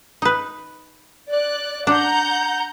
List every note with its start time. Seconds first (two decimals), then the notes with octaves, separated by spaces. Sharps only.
0.22 D#4 B4
1.29 D5 F#6
1.87 D4 F#5 A#5 G6